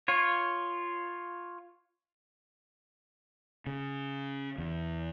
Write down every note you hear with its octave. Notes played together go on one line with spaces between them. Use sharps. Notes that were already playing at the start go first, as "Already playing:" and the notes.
F4 C#5
C#3
E2